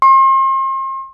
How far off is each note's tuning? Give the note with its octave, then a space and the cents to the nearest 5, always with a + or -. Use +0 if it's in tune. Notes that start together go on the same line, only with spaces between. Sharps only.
C6 +40